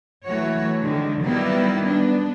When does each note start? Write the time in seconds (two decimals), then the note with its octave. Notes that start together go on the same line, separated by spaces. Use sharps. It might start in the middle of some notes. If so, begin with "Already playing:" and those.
0.26 E3 F#3 A3 F#4 C#5
0.84 D3 D#3 G#3
1.22 D#3 F#3 G3 A#3 B3 E4
1.85 B3 D4